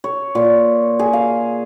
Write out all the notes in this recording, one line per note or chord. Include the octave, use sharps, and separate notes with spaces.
C#5
A#2
G#4
F5